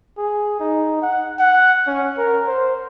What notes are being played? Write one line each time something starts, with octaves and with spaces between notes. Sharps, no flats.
G#4
D#4
F#5
F#5
C#4
A#4
C5